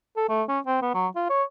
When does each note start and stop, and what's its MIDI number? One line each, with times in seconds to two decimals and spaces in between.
0.17 0.27 69
0.29 0.43 57
0.48 0.59 61
0.66 0.77 60
0.82 0.93 59
0.94 1.07 54
1.15 1.28 65
1.29 1.43 73